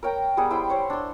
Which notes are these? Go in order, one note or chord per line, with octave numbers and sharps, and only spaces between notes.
A#4 C#5 G5 A#5
G3 B3 G#4 F#5
E4 C5 G5
C5 C#5 F#5
D4 C6